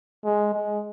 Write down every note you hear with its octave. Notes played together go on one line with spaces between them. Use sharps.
G#3
G#3